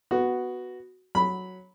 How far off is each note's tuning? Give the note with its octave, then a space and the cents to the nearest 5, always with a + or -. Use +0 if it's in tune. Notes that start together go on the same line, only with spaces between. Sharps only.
B3 +0 F#4 +0
F#3 +0 B5 +0